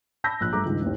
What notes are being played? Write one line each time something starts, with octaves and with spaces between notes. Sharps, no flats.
A5 B5 E6 G6 A#6 B6
A#1 F#6
G2 A3 A4 A#5 D6
C#2 G2 D#3
A1 D#2